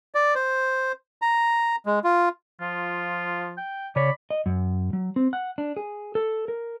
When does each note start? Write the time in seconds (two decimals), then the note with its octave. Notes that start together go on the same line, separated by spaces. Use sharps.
0.15 D5
0.35 C5
1.22 A#5
1.86 G#3
2.04 F4
2.61 F3 F4
3.57 G5
3.96 C#3 C#5 D5 B5
4.30 D#5
4.46 F#2
4.93 F#3
5.16 C4
5.33 F#5
5.58 D4
5.77 G#4
6.15 A4
6.48 A#4